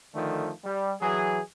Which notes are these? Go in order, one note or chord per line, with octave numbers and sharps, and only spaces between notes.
D3 D#3 F3 A3
G3
E3 F#3 G#4